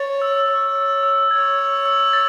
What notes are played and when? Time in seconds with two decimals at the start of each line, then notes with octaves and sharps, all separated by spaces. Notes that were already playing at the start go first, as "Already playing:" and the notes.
Already playing: C#5 A6
0.22 E6
0.48 C#5 E6
0.75 E6
1.03 E6
1.31 C#5 G#6
1.59 E6
1.85 E6
2.13 A6